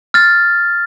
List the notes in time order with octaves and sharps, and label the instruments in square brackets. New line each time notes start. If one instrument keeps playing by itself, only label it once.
[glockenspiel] F6 A6